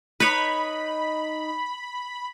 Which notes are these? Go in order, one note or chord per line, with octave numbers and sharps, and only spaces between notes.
D#4 B4 C#5 B5